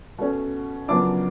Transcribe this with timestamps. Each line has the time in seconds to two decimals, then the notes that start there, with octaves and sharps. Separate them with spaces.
0.18 B2 A3 C#4
0.88 F#2 C#3 F3 B3 D4 D6